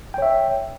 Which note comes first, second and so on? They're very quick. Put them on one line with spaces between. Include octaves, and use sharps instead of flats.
G5 C#5 E5